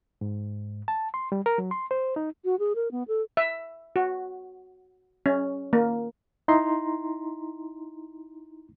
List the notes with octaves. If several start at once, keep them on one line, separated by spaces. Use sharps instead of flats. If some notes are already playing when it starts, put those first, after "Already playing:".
G#2
A5
C6
G3
A#4
F#3
C6
C5
D#4
F#4
G#4
A#4
B3
A4
E5
F#4
C#4
A#3
D#4 E4 A#5 C6